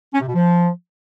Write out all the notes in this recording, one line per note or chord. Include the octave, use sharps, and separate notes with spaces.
C#4
C3
B2
F3